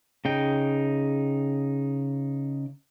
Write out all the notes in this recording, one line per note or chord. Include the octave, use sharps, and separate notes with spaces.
C#3 D#4 G5